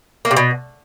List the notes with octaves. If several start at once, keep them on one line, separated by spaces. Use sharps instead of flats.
A#3
C3
B2